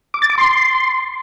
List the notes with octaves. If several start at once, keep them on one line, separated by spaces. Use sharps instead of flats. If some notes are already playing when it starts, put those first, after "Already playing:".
D6
A6
D6
C6